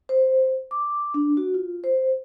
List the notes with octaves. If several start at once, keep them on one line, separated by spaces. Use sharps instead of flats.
C5
D6
D4
F#4
F4
C5